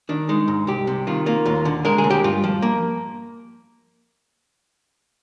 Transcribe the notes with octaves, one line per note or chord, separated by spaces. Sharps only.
D#3 D4
G#3 D#4
G#2
C2 G4
C3
D#3 F4
A#3 F4
D#2 F4
D3
G#3 A#4
G#4
D#2
G4
G2 F4
F3
A#3